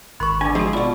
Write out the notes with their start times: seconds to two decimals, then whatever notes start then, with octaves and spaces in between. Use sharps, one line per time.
0.20 G#1 D#3 A#4 B5 C#6
0.41 D3 D4 G#5
0.55 F3 G#3 D#4 F#4 G#4
0.73 E2 B2 F4 D5 B5 C#6